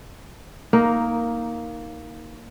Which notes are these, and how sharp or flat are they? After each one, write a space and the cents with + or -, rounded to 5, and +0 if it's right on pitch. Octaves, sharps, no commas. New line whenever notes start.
A#3 +0 D#4 +10